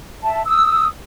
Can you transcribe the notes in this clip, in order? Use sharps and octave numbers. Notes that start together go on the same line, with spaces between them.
E5 A5
D#6 E6